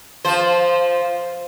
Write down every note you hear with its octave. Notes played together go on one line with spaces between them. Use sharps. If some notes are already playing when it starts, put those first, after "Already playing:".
F3 C5